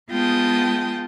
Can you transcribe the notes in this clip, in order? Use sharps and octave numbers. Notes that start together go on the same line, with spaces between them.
G#3 B3 F4 G5 A5 D#6